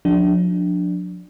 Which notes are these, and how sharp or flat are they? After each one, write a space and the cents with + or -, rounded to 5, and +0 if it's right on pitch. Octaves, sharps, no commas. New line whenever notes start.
F3 +45 D4 +0